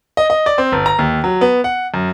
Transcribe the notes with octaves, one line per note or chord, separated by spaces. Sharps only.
D#5
D#5
D5
C4
G1
A#5
D#2
F#3
B3
F#5
F#2